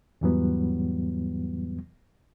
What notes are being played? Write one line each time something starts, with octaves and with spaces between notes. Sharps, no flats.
E2 G#2 E3 F#3 G3 B3